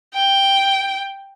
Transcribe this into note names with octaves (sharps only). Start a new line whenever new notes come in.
G5